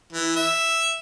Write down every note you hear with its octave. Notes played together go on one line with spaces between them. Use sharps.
E3
E5